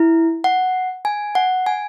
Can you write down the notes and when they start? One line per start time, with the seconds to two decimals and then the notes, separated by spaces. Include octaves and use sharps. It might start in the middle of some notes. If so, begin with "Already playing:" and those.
Already playing: E4
0.44 F#5
1.05 G#5
1.35 F#5
1.66 G#5